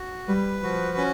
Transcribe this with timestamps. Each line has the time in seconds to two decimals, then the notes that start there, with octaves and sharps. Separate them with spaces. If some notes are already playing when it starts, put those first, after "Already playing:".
Already playing: F#4
0.28 G3 B4
0.63 F3 F#4
0.98 C#4